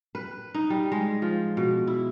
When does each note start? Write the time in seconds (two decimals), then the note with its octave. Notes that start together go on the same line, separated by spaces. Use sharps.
0.15 B4
0.54 D#4
0.70 G3
0.92 G#3
1.22 F3
1.57 B2
1.87 E4